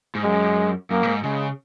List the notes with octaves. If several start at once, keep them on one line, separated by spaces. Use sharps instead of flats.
G#2
F#2 G#3
F#2 A#3
A#2
G#2
C#3 G#3